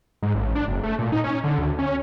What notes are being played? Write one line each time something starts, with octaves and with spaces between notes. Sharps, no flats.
G#2
A1
D4
F#1
A3
A#2
D#4
C#4
D3
D2
C#4